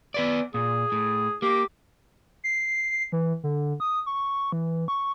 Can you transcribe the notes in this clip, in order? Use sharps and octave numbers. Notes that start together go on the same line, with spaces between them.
B3 B4 D5
A#2 G#4
A2
A#3 G4
C7
E3
D3
D#6
C#6
E3
C#6